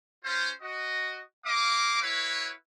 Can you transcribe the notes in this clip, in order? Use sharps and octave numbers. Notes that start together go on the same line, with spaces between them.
C#4 F4 C5
F#4 D#5
A#3 D#5 F5 D6
E4 F#4 B4 C#5 E5 F5